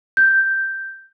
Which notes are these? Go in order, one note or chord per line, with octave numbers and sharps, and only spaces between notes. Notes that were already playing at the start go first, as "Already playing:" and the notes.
G6